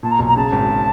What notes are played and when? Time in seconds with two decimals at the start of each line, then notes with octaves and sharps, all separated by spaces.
0.03 A#2 A5
0.11 A#5
0.19 B1
0.28 A#5
0.36 C#3 A5
0.52 G#1